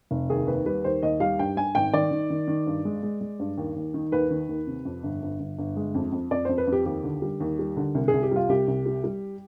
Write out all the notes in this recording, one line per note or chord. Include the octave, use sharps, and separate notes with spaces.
F1
D#2 G#4
D#2 B4
G3 B4
D#2 C5
D#2 D#5
G3 F5
G2 G5
G2 G#5
G#1 G5
D#3 D5
D#3
D#3
D#3
G2
G#3
G#3
G#3
G2
D#2
D#2
D#3
D#2 B4
D#3
D#2
C3
F2
G1
G1
G1
G1
G#3
F2
F2
F2 D5
F2 C5
B4
F2
G4
D#2 G4
D3
G3
D#2
G3
D3
C2
G#4
C2
G4
G3 F4
C2 G4
C2
G3
G3